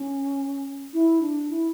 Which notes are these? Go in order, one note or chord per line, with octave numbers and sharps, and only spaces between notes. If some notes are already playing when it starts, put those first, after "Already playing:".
Already playing: C#4
E4
D4
E4